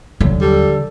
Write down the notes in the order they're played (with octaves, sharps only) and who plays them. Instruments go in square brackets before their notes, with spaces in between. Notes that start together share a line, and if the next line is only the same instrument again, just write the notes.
[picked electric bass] D#1 F#3 [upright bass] D3
[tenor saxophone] G3 [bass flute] A4